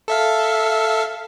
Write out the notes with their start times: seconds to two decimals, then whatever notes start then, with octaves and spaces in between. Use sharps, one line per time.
0.08 A4 E5 F5